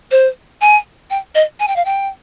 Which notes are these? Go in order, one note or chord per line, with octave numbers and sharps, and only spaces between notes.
C5
G#5
G5
D#5
G#5
G5
F5
G5